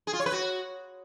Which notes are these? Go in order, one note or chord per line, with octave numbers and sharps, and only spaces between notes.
G#4
F4
C#5
B4
F#4